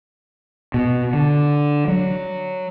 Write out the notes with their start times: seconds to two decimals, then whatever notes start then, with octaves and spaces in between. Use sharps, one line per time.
0.74 B2
1.13 D3
1.88 F#3